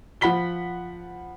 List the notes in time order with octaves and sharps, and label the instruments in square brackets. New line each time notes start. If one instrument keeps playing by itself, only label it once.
[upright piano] F3 F#5 B5 B6 G7